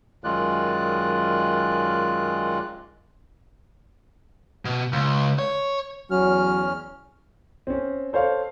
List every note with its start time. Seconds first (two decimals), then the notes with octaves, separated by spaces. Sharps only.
0.24 F#2 D#3 G#3 F4 D5 F#6
4.65 B2
4.92 C#2
5.39 C#5
6.11 E2 F#3 C#4 F6
7.67 C4 C#4
8.13 A4 C5 C#5 F5